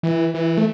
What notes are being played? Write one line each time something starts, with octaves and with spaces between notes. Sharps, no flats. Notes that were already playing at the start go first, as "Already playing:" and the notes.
E3
E3
A3